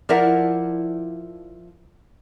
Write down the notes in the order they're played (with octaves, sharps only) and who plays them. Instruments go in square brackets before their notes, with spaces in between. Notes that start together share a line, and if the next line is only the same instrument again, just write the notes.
[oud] F3 E4 A#4 [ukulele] D5 E5 F#5